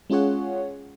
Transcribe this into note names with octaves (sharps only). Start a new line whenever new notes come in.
G#3 C#4 F4 G#4 C#5 F#5